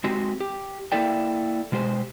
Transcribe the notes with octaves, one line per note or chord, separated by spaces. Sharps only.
G#3 C4 F#4 G4
G4
A#3 E4 A4 D5 G5
B2 G#3 G4 C5